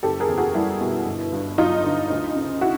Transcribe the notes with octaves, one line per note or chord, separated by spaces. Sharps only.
F#1 G4 A4
G#4 A#4
E2
F#4 G#4
G3 E4
B2
G1
G2
F#3 D#4 F4
D3
D2
C#3
E4 F#4